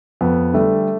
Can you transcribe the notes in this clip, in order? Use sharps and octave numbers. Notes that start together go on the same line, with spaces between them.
F2 B3
D3 G3 A3